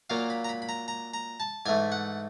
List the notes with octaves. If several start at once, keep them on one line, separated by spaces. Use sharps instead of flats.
A#2 F#3 A#3 F5
B5
A#5
B5
B5
A#5
A#5
A#5
A5
G#2 E3 A3 G#5
F#5